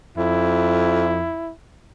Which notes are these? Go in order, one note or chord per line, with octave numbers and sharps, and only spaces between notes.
F2 E4